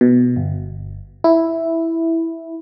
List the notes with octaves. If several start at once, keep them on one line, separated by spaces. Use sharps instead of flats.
B2
G1
E4